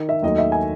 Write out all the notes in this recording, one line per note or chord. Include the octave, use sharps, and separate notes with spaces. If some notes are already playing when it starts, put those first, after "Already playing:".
Already playing: D#3
E5
D#2 D#3 F#3 A3 D#5
E5
G#5